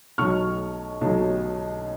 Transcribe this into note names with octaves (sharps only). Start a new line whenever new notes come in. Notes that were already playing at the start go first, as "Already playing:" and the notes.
B1 B2 F#3 C#6 F6
B1 B2 F#3